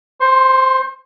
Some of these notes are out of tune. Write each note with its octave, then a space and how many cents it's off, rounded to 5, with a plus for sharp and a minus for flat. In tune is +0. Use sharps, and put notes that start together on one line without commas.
C5 +0 C6 +40